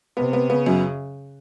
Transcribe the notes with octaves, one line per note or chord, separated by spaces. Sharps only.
C3 B3
B3
C#3 B3
F#2